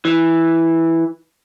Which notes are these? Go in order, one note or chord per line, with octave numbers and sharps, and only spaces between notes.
E3